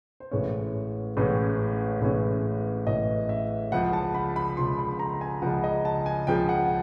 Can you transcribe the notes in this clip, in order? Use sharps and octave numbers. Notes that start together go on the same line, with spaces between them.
C5
A1 A2 E3 G#3 C#4 C#5
A1 A2 E3 G#3 C#4
A1 A2 E3 G#3 C#4
A1 A2 E3 G#3 C#4 D#5
E5
C#2 C#3 F3 F#5
A5
B5
B5
C#2 C#3 F3 C6
B5
A#5
G#5
C#2 C#3 F3 F#5
D#5
A5
G#5
C#2 C#3 F3 G5
F#5